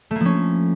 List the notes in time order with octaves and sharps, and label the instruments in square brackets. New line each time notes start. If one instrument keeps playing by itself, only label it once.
[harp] A3
A#3
F3
C#4